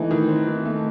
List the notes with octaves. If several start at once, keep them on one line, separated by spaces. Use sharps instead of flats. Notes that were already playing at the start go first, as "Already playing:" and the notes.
Already playing: E3 A3 D#4
D#3
C4
D#3
A3